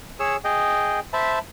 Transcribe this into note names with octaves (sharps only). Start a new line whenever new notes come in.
G#4 C#5 E6
G#4 D#5 G5
C5 E5 A5 B5